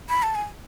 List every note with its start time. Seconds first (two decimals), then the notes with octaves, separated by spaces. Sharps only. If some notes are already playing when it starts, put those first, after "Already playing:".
0.09 B5
0.23 A5
0.35 G#5